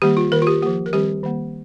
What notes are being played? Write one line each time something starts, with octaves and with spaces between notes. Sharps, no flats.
D#3 G3 A#3 G4
F4
D#3 A#3 A#4
F4
G4
F3 A#3 G4
A#4
D#3 G3 C4 G4
D#3 G3 A#3